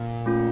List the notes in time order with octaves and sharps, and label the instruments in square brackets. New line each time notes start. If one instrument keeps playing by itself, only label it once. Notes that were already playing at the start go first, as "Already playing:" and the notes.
Already playing: [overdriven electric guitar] A#2
[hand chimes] A3 C#4 F4